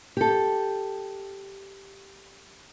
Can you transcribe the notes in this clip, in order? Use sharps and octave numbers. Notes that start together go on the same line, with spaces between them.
G4 A4